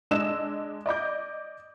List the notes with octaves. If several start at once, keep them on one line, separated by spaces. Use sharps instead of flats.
G#3 D4 D#5 E6 E7
D5 D#5 D6 G6